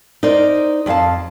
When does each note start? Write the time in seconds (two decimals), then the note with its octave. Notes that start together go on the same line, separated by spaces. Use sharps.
0.23 D#4 A#4 C5 D5
0.86 F2 C#4 A4 F5 A5